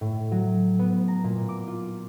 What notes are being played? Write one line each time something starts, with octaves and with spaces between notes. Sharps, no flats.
A2
F#3
B3
A#5
A#2
D6
F4